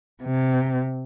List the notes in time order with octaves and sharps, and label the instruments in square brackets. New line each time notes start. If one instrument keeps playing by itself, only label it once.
[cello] C3